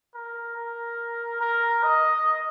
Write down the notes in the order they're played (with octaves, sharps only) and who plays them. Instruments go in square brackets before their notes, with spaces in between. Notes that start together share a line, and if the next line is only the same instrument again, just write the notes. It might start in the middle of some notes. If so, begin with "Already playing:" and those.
[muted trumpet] A#4
A#4
A#4
D#5